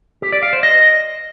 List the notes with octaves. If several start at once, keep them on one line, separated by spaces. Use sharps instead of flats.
G4
D5
F5
C5
D#5